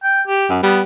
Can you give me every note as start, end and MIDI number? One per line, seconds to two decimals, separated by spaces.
0.04 0.22 79
0.27 0.49 67
0.49 0.62 42
0.63 0.83 55
0.63 0.80 59